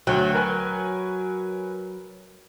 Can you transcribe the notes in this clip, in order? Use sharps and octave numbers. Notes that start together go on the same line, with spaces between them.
D2 F#3 G5
A#4 B4 G#5